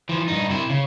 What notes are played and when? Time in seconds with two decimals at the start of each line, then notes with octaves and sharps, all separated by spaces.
0.09 E3 F3
0.28 G2 D#4
0.50 C3 E4
0.70 C#3